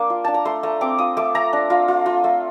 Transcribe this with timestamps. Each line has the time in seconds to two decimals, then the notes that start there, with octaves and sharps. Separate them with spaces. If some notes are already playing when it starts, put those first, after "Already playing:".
Already playing: A#3 D4 D6
0.10 F4
0.25 D4 A5
0.34 A#5
0.45 A3 C6
0.63 A3 A#5
0.81 C4 D6
0.98 F4 D#6
1.17 A3 D6
1.35 A3 A#5
1.53 D4
1.70 F4
1.88 F4
2.06 F4
2.24 A3